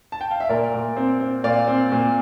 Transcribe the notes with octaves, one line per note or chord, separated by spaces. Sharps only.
A5
G5
F5
E5
A#2 A#4 D5
A#2
C4
C4
A#2 D5 F5
C4
A#2